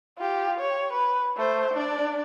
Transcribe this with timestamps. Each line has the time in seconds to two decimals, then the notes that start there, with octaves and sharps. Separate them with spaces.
0.18 F4 G4
0.60 C#5
0.93 B4
1.37 A3 C5
1.73 D4 D5